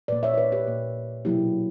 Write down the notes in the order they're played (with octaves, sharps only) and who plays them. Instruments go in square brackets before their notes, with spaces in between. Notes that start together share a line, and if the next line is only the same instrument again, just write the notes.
[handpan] A#2 A#3 B4 D5
C#5 E5
C#5
B4 D5
G4 B4
A#2 A#3
B2 F#3 A#3 E4 G4